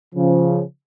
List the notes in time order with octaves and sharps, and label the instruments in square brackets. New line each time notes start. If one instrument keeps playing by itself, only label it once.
[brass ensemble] C#3 F3